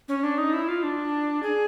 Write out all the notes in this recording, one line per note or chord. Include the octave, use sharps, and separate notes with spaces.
C#4
D4
D#4
E4
F4
D4
G#4